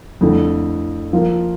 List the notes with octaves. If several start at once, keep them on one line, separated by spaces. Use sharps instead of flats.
F2 D3 A3 E4
F3 A#3 F4 A#4